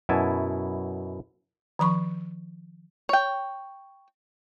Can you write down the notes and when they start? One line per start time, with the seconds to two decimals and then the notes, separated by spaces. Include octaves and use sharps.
0.09 F#2 B2 E4 G#5 A5
1.79 D#3 F3 B5 C#6
3.09 C#5 G5